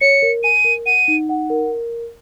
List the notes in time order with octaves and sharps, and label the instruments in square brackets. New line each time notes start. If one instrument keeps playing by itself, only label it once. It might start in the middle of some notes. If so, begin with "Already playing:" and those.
[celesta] C#5 [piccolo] C#7
[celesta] A#4
[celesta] G#5 [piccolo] D#7
[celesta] A#4
[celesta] F#5 [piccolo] D#7
[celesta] D#4
F#5
A#4